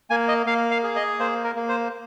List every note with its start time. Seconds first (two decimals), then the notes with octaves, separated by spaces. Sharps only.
0.10 A#3 G#5
0.28 D#5
0.46 A#3 F5
0.71 F5
0.83 G#4
0.96 D#5
1.20 A#3 C5
1.44 A#4
1.56 A#3
1.69 C5